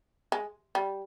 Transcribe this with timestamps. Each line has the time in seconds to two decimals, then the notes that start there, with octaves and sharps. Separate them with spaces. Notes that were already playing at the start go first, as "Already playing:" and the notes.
0.32 G#3
0.75 G3